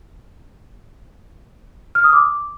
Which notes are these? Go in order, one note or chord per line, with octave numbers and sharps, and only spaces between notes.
F6
D#6
D6